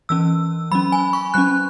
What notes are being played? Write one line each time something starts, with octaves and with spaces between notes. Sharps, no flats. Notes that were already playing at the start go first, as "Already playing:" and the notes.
E3 C#4 E6
F#3 C#4 B5
G#5
C#6
F#3 C#4 F#6